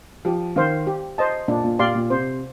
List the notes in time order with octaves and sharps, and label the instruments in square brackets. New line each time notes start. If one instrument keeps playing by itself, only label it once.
[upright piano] F3 [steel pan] G4
[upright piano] D#3 [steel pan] C5 F5
[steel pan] G4
C5 D#5 A5
[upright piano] A#2 [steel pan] D4
[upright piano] A#2
[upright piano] A#2 [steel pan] G4 D5 F5 C6
[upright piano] A#2
[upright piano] C3 [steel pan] C5